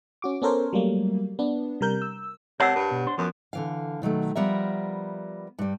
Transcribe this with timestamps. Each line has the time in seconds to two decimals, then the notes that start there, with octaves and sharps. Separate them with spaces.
0.22 C#4 F#4 D6
0.42 B3 C#4 A4 A#4 C5 C#5
0.73 F#3 G3 A3 A#3
1.39 B3 D4
1.81 C3 G3 A#4 G6
2.02 E6
2.60 C3 A#4 C#5 F#5 A5 E6
2.76 G2
2.91 B2
3.07 D4 C5
3.18 F#2 F3 B3
3.53 D3 E3 F5
4.02 B2 D#3 F#3 A3
4.36 F3 G3 B3 A#4 E5
5.59 G2 G3